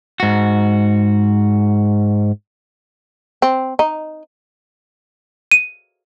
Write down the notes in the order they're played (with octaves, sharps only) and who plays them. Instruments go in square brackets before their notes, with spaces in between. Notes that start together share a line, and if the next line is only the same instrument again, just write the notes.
[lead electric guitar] G#2 F#4
[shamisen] C4
D#4
[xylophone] D#7